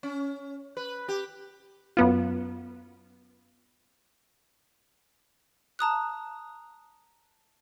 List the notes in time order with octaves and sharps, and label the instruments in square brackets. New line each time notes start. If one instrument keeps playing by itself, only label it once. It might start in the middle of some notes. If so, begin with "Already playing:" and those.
[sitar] C#4
B4
G4
[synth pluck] F#2 B3 F4
[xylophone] A5 A#5 D#6 F#6